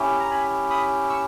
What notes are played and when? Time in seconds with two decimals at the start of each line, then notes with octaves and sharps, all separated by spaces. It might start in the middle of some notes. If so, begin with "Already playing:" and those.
Already playing: C#4 E4 G4
0.20 A#5
0.31 G#5 B5
0.70 B5 D#6
1.10 C#6 E6